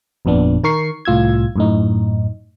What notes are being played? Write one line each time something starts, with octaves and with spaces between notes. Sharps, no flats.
G1 F2 A#2 B3 D4
D#3 A#4 C#6 C7
C2 A2 F4 E6 G#6
F#2 A2 D#4